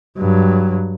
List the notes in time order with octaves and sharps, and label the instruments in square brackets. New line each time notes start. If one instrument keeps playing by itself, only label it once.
[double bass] G2 F#3